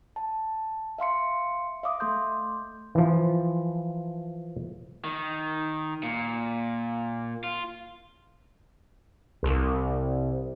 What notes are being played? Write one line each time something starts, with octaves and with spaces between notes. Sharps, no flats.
A5
E5 F5 C6 C#7
E5 F5 D6 D#6
A3 A4 C6 G6
E3 F3
D#3
A#2
F4
C2